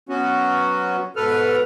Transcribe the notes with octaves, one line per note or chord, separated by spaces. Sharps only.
F#3 B3 C#4 F#4
G#2 B2 A4 B4 F6